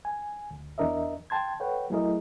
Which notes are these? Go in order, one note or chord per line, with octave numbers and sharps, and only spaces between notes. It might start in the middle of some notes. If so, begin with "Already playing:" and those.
G#5
D2
E2 D4 A#4 D#5 E5
G5 A5 C6 G#6
A4 B4 C#5 F#5 G5
F#3 A3 E4 G#4 A#4 D#5